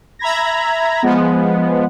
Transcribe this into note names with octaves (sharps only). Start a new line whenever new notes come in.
E5 A#5 B5 G#6 A#6
F3 G#3 B3